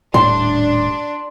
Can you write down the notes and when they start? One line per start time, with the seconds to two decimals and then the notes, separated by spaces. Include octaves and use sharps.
0.14 D#1 A2 G3 D4 C6